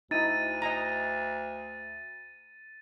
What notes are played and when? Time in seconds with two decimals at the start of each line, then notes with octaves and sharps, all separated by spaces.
0.11 D2 D#4 E4 A6 D#7
0.62 D#5 G#5 A#5